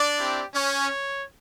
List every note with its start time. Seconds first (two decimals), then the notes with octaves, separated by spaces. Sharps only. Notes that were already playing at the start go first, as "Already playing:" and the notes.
Already playing: D4 D5
0.16 C4 E4 G4
0.54 C#4 C#5